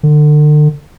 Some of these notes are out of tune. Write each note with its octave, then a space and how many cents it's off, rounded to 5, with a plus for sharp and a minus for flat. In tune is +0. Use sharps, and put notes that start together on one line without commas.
D3 +35